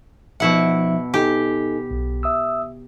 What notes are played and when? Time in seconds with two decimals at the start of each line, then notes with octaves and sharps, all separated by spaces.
0.40 B2 F3 D#4 E4 E5 F#5
1.14 D#4 G4 A4 G#5
1.91 B1
2.23 E5 D#6 E6